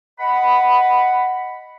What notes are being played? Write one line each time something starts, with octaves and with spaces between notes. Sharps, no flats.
D#5 F#5 B5